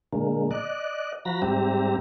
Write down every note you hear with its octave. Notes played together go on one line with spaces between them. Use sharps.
A#2 D3 G#3 A#3
D5 D#5 F#6
F3 F#4 A#5 B5 A#6
G#2 G3 C4 G4 E5 A#5